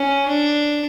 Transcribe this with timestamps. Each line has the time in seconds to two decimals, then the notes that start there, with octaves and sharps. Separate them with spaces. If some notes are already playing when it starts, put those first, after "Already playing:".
Already playing: C#4
0.28 D4